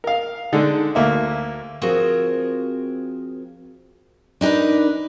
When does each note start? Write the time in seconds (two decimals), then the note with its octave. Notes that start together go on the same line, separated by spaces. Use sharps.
0.04 A#4 F5
0.53 D3 G#3 D4 D#4 A4
0.95 D2 A#3 E5
1.81 F3 C4 F#4 G#4 A#4
4.41 D4 D#4 G4 A#4 B4